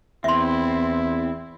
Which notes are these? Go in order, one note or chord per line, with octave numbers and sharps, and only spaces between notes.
E2 C4 E4 E5 C6